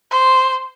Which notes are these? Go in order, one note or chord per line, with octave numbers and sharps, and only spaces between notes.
C5